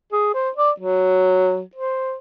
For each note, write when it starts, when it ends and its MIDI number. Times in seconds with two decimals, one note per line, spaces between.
0.12 0.31 68
0.35 0.50 72
0.56 0.71 74
0.80 1.62 54
1.75 2.16 72